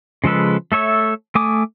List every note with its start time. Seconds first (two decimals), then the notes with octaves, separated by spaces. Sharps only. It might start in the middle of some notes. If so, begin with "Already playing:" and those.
0.24 C#3 F3 G#3 A4 B4
0.72 A3 A4 C#5 E5
1.35 A3 G#5 D6 D#6